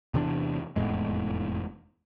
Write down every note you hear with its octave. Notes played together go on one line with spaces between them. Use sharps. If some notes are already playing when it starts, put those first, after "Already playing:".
E2 C3 E3 D4
F1 E2 A2 G#3